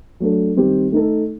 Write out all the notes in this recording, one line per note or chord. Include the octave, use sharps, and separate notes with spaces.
F#3 A3 D4 A4
D#3 G3 C4 G4
A3 D#4 A4